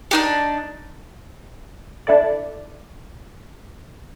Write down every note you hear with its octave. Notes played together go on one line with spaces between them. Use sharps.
D4 D#4 G4
D4 E4 A4 D5